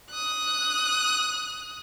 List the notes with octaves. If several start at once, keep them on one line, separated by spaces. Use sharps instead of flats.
D#6 F#6